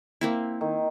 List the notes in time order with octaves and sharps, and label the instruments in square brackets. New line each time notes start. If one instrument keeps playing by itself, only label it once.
[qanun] A#3 C4 E4
[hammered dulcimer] D#3